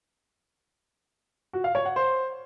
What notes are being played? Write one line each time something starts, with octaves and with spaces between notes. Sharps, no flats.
F#4
F5
C#5
F#5
C5